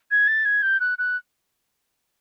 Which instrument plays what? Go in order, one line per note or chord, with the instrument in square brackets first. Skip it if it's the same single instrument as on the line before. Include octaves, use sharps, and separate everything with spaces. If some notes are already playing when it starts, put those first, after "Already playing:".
[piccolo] G#6
A6
G#6
G6
F#6
F#6